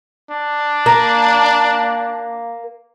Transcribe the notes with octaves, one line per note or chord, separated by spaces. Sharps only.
D4
A#3